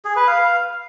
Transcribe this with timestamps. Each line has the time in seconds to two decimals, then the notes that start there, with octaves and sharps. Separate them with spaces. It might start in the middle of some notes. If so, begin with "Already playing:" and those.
0.05 G#4
0.16 B4
0.27 F5